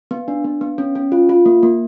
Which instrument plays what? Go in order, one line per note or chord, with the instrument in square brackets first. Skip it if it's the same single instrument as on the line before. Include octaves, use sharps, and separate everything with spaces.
[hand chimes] B3
D4
B3
B3
C#4
C#4
F4
F4
A#3
A#3